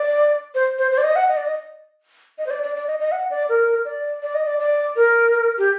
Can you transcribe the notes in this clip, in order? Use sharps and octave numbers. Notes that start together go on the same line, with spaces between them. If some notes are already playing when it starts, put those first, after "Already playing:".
Already playing: D5
C5
C5
C5
D5
D#5
F#5
D#5
D5
D#5
D#5
C5
D5
D5
D5
D#5
D#5
F#5
D5
A#4
D5
D5
D#5
D5
D5
A#4
G4